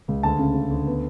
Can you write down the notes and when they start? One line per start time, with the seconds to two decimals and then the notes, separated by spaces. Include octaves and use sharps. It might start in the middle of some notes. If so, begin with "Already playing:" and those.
0.08 C#2
0.23 D2 A5
0.39 C#3
0.54 C#3
0.71 D2
0.87 B3